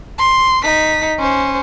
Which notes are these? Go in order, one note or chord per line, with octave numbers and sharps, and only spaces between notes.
C6
D#4 B6
C#4 C5